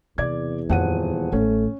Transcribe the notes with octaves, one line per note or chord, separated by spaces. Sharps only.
E2 C3 D5 G#6
D#1 F2 F#5 D#7
A1 A3 C#4